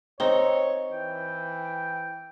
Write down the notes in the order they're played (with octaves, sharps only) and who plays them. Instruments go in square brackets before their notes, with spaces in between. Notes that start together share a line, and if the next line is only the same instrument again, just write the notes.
[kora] C4 D#4 [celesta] C5 G7 [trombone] C#5
[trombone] E3 [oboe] G5